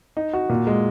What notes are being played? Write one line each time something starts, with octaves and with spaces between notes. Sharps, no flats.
D#4
F#4
A#2
G#3